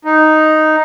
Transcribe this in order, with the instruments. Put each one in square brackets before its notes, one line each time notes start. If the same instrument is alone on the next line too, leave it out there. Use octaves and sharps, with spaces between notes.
[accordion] D#4